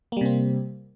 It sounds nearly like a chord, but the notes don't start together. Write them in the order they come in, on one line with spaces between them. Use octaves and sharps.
A#3 G3 C3 C4